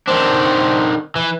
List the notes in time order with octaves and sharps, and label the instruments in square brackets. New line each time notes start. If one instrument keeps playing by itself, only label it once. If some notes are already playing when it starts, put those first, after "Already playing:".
[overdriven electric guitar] D#3 D4 [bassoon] C4
[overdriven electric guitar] E3